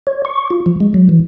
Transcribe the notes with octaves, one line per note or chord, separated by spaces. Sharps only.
C#5
C#6
F4
F3
G#3
F#3
E3